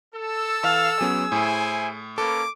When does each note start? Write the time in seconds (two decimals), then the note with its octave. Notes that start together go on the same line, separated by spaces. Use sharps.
0.15 A4 E6
0.64 E3 F5
1.01 F#3 B3 C#4 G#4
1.32 A2 E4 C5 G#5
2.18 A#3 C#4 A4 B4 D6